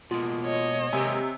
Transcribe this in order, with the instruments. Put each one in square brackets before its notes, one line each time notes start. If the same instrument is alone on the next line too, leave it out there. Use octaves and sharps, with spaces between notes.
[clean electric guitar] B2 G#3 A#3 [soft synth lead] F4
[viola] C#5 D#5
[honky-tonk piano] C3 [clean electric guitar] G#3 A#3 G4 [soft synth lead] G#5